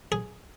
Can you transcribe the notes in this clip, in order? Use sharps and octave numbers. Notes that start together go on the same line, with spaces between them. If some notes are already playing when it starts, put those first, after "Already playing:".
G#4